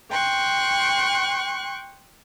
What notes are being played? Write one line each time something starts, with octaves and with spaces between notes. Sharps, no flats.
G5 C6 C#6 F#6